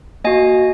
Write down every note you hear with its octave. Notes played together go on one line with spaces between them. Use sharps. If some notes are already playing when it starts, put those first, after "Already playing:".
A#3 F#4 D#5 G#5